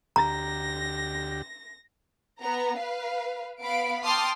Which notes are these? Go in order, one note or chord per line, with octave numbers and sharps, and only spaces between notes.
D2 G4 A#5 A#6
B3 A#5
B4 F5
B3 F5 B5 D7
G5 A5 C6 D6 D#6 F6